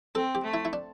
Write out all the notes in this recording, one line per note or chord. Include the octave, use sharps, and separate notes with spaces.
C4 A4
G4
A3
E4
E4
D4